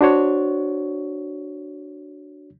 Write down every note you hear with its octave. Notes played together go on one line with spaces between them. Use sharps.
D4 F#4 C5 C#5